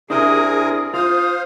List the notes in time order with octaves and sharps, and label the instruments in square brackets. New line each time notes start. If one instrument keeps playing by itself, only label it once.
[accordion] C3 G#4 A#4 [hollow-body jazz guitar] D4 E4 C5 [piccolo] D#6
[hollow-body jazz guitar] F4 [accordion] C5 F5 [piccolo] D#6